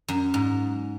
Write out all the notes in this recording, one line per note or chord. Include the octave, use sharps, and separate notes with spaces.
F#2
G#2